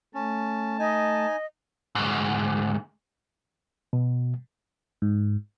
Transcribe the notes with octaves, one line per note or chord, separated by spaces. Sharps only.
A3 C#4 A5
D#4 D#5 G#5
D2 G#2
B2
G#2